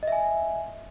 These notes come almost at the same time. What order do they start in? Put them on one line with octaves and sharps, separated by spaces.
D#5 E5 G#5